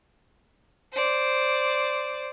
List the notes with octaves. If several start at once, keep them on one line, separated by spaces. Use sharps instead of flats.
C5 D5